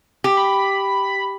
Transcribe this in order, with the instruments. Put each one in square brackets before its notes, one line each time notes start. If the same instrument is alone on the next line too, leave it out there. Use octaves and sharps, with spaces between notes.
[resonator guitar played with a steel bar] G4
[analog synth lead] B5